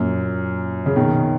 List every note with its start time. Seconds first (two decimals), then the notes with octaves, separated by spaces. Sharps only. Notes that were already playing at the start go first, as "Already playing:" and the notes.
Already playing: F#2 A#2
0.86 C#3
0.96 B2 D#3